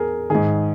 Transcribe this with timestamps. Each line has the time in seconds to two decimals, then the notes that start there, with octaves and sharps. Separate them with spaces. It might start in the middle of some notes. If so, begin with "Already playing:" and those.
Already playing: E2 G#4 A#4
0.30 G#2 D#3 G#4